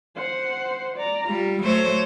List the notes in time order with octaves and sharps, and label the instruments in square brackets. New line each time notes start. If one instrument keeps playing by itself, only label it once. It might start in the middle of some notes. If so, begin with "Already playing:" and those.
[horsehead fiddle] C5 F#5
D5 A#5
[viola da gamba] G3 [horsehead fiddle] F4
[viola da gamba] F#3 A3 C5 [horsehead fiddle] C#5